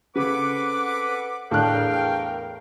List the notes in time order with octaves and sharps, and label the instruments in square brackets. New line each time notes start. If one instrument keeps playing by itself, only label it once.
[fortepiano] C#3 [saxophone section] C4 A4 B4 [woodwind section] F#5 D6
[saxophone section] E2 A#4 [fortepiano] A2 D4 F#6 [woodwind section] F5 G5